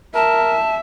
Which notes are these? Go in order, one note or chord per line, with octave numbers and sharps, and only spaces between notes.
A#4 E5 A5